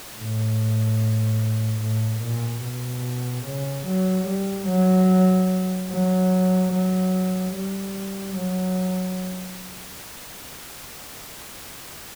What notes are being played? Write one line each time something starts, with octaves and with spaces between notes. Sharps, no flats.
A2
A2
A#2
B2
C#3
F#3
G3
F#3
F#3
F#3
G3
F#3